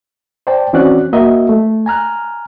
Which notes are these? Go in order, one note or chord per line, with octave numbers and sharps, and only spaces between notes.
C5 D5 G5 A5
E3 C4 C#4 F#4 D5 F#6
A#3 F#4 D#5 E5
A3
G#5 A#5 F6 F#6